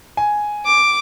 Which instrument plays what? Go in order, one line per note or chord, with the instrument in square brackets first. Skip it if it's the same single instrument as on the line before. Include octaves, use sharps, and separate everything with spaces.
[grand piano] G#5
[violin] D6